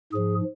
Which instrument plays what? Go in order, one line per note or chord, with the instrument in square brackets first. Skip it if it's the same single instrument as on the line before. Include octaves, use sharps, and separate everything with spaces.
[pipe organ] G#2 F3 G#4